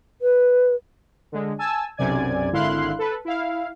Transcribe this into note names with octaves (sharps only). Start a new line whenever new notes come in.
B4
D3 G#3
G#5 A5 E6
B1 F#2 C3 D5 G#5 G#6
G#1 D3 E4 F5 C6 F#6
A4 B4
E4 F5